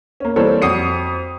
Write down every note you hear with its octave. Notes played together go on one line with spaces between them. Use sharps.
A#3 C#4
E3 G3 A#3 C4 A4 C#5
F2 C4 F#4 D#6 C7 C#7